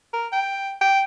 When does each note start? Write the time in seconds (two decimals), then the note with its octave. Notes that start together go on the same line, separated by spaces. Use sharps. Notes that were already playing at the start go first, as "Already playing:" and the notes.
0.13 A#4
0.32 G5
0.81 G5